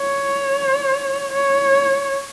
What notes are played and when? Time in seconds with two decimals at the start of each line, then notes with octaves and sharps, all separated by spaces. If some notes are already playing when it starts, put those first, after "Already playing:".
Already playing: C#5
1.33 C#5